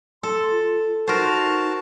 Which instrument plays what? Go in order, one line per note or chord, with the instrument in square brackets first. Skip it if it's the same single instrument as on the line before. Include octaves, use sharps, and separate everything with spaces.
[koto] A4 [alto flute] C6
[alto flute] F4
[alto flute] D#4 [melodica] F#4 A5 [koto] A#4 C5